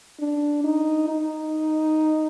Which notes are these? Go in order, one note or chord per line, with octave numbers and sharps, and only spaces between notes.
D4
D#4
D#4